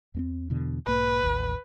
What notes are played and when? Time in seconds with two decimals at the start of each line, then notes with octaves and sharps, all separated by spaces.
0.14 E2 A#3 C4
0.50 E2 B2 D3
0.87 B1 G#2 A#3 B4
1.23 A1 D#2